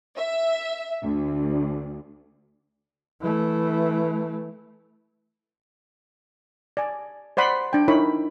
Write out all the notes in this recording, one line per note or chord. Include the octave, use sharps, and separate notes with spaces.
E5
D2
E3 A3
D5 G#5
C5 D5 F#5 B5 C6
D4 G5
D#4 E4 A#4 C#5 B5